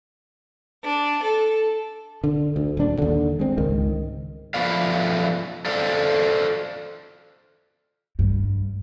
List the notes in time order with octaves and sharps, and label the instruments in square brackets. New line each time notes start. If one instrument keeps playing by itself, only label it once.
[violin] D4
A4
[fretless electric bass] D3
D2
D#1 D4
D#2 D3
G#3 C4
C#2 G#2 D#3
[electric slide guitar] F3 A3 B3 B4 D5 F5
A4 C5 D5 F5
[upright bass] G2